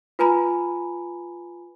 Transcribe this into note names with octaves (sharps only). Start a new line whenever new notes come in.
F4 B4 G#5 A#5 B5